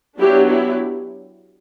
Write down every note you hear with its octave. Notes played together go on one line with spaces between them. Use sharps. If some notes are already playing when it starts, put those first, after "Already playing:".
F#3 B3 D4 E4 G4
E4 G4